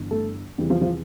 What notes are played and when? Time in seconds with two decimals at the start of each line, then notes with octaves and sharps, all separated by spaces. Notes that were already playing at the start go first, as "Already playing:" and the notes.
Already playing: G1 G2 E3
0.11 A3 A4
0.58 E2 C3 E3 G3 G4
0.70 F3 F4
0.81 F3 F4